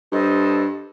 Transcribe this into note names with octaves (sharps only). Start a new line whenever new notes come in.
G2 A4 C5 D#5